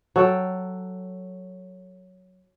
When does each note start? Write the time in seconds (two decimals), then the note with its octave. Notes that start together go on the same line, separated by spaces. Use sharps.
0.16 F#3 A4 G5